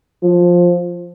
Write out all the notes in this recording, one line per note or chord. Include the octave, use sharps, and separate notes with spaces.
F3